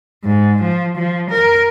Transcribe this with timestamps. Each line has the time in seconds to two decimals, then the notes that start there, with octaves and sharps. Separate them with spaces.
0.24 G#2
0.63 F3
0.97 F3
1.31 A#4